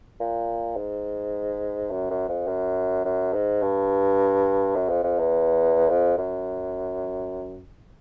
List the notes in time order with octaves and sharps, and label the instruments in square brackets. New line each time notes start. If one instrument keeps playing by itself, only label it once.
[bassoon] A#2
G#2
F#2
F#2
F2
F#2
F#2
G#2
G2
F#2
F2
F2
E2
F2
F#2